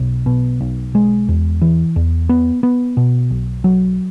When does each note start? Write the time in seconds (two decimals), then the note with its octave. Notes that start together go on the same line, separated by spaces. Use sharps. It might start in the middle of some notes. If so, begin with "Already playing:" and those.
Already playing: B1
0.26 B2
0.61 B1
0.95 G#3
1.29 E2
1.61 E3
1.96 E2
2.29 B3
2.63 B3
2.97 B2
3.31 B1
3.64 F#3